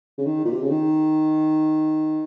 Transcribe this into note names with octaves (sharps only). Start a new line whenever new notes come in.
C#3
D#3
A#2
C3
C#3
D#3